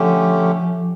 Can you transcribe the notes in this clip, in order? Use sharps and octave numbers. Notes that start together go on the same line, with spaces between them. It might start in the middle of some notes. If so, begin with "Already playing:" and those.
Already playing: D3 F3 A3 C#4 G4